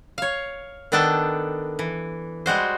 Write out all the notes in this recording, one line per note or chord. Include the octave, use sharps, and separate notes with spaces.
C#5 F5
D#3 B3 D4 A4 G5 A5
E3
G3 G#3 F#4 C5